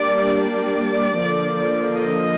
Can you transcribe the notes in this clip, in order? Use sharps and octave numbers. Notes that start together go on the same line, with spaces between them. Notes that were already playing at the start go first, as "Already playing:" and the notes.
Already playing: G3 A#3 D4 D5
D5
D3 F3 A#3
D#5